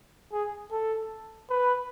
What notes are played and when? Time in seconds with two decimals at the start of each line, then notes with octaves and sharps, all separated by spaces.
0.32 G#4
0.71 A4
1.50 B4